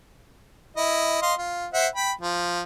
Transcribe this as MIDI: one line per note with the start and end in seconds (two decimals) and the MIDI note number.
0.77 1.19 64
0.77 1.19 75
1.22 1.34 75
1.22 1.34 77
1.22 1.34 84
1.38 1.67 65
1.74 1.87 72
1.74 1.87 76
1.74 1.87 78
1.96 2.12 79
1.96 2.12 83
2.22 2.61 53